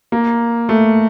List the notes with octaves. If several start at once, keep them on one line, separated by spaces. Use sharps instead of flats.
A#3
A3